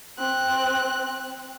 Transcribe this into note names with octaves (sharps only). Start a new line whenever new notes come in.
C4 F#6